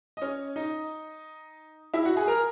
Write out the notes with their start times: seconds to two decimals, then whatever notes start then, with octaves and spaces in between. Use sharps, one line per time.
0.17 D#5
0.22 C#4 C#5
0.56 D#4 D#5
1.94 E4 E5
2.05 F#4 F#5
2.17 G#4 G#5
2.28 A#4 A#5